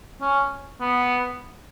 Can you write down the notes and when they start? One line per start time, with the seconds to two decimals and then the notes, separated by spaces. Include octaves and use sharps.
0.21 C#4
0.81 B3